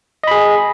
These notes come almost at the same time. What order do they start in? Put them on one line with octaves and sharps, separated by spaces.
D#5 B5 G#4